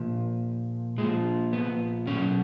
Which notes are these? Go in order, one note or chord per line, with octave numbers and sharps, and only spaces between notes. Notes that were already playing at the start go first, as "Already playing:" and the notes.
Already playing: A#2 F3
A#2 F3 G#3
B3
B2 F#3 C#4